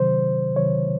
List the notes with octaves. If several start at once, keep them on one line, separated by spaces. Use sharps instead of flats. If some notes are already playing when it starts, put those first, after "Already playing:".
Already playing: C3 D#3 F#3 C5
C3 D#3 F#3 C#5